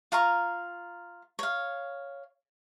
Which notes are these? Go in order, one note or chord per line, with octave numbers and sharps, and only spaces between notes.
F4 F5 A#5 C#6
C#5 F5